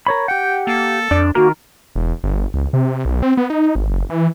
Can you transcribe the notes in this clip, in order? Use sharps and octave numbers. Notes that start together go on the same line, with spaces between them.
A#4 C#5 B5
G4 F#5 G5
A#3 A4
F2 D4 D5
D#3 A#3 F#4 A#4
E1
G1
C#2
C3
B1
C4
B3
D#4
G#1
F#1
E3